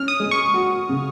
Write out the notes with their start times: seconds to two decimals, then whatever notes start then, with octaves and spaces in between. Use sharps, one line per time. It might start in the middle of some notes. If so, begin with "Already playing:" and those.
Already playing: C#4 F6
0.08 D#6
0.20 G#3
0.31 C#6
0.54 F#4
0.89 C#3